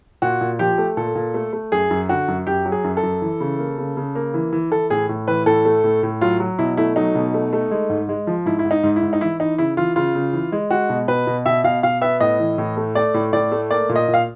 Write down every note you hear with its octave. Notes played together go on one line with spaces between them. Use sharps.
A#2 F#4
A#2
F3 G4
A3
A#2 A4
A#2
A3
A3
F#2 G#4
F#2
D3 F#4
F#2
F#2 G4
F#3
G#4
F#2
A4
F#2
E3
C#3
A#3
C#3
C#3
A#3
E3
E3
E3 A4
A2 G#4
A2
E3 B4
A2 A4
A3
A2
A2
F#3 F4
F#3
B2 E4
A3 E4
F#3 D#4
B2
A3
A3
G#3
G#2
G#3
F3
G#2 E4
E4
G#2
D#4
G#2
E4
G#2
D#4
E3 E4
E3 D#4
C#3 E4
E3 F4
C#3 F4
C#3
E3
G#3
G#3 F#4
B2
B2 B4
B2
B2 E5
B2 F5
B2 F5
B3 E5
A2 D#5
E3
A2
A3
A3 D5
A2
A2 D5
A3
A#3 D5
A#2
D#5
A#2
F5